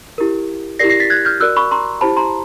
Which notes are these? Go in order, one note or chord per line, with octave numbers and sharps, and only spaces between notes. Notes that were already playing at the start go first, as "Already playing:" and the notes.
E4 G4 A#4
E4 G4 A#4 D5 A#6 C7
A#6 C7
A6 B6
F#6 G#6
F6 G6
F#4 A#4 D5 E6 F#6
B5 C#6
A#5 C6
E4 G4 C5 A5 B5
A#5 C6